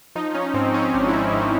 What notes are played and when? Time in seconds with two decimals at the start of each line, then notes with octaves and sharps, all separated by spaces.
0.15 F3 D#4
0.35 C#4
0.54 G#2 C4
0.74 C#4
0.94 G#1 D4
1.08 E4
1.13 D#4
1.32 G#1 D#4